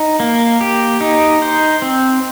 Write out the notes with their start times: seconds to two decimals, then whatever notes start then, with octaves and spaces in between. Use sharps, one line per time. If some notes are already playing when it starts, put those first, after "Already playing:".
Already playing: D#4
0.20 A#3
0.61 G4
1.01 D#4
1.42 C5
1.82 C4